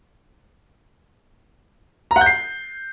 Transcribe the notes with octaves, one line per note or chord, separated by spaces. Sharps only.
A#5
F#5
G6
C7